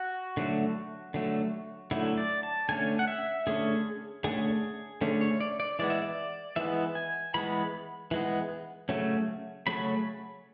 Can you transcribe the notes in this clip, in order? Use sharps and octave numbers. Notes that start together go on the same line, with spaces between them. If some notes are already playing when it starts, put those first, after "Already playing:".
Already playing: F#4
D3 F#3 A3
D3 F#3 A3
D3 F#3 A3 E4
D5
A5
D3 A3 C#4 G#5
F#5
E5
D3 A3 C#4 G#4
D3 A3 C#4 G#4
D3 A3 C#4
C#5
D5
D5
E3 G#3 B3 D5
E5
D5
E3 G#3 B3 E5
G#5
E3 G#3 B3 B5
E3 G#3 B3
C#3 F#3 A3 C#4
C#3 F#3 A3 C#4 B5